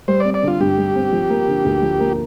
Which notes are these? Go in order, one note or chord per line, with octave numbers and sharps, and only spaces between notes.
G3 C5
C4 D5
D5
D3
F4
G2 G4
G3
C4
F3
A#3
D3
D2
F3
A#3